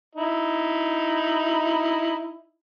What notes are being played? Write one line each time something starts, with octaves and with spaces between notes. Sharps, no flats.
D#4 E4